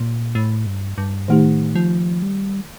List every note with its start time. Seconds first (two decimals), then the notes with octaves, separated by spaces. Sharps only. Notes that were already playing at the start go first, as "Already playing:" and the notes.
Already playing: A#2
0.35 A2
0.66 G2
0.98 G2
1.28 A2 D#3 A3 D#4 G4
1.75 F3
2.22 G3